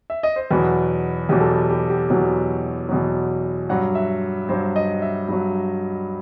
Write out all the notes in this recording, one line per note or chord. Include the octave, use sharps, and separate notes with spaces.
E5
D#5
C5
E2 B2 F#3 B4
E2 B2 F#3 G4
A4
G4
G4
G4
E2 B2 F#3
E2 B2 F#3
G2 F#3 F#5
E5
G2 F#3 C5
D#5
E5
G2 F#3